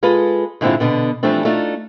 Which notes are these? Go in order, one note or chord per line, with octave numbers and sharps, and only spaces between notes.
G#3 F4 G#4 A4 B4
G#2 D3 G#3 C4 E4 F4
B2 D3 B3
E3 F3 G3 A3 C4 D4
A3 D4 D#4 F4